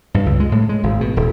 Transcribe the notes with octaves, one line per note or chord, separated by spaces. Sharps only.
G2
C#2
G#3
A2
G#3
G#1
B2
D#1